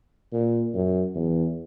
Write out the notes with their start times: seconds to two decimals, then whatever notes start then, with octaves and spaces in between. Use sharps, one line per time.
0.33 A#2
0.74 F#2
1.15 E2